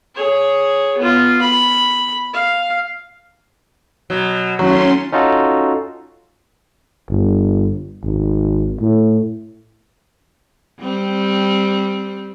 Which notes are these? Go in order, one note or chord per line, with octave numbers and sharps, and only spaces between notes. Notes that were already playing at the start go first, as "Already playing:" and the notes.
G#4 C#5
B3 F4
B5
F5
B2 F#3
D#2 F#3 A3 C#4 C6
C#4 D#4 F4 F#4 A4
G1
G#1
A2
G3 C4